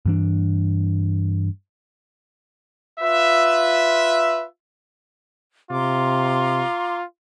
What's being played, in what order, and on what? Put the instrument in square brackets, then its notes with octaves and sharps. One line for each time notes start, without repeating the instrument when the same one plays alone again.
[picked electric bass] G2 E3 D4
[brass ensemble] F4 B4 E5
[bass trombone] C3 [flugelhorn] F4 [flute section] A#5 C6 D6